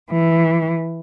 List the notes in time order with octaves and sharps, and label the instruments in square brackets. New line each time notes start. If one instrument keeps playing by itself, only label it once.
[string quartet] E3